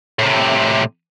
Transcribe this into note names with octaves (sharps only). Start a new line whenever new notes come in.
A2 C3